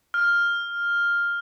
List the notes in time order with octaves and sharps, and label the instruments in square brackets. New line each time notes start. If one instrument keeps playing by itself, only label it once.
[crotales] F6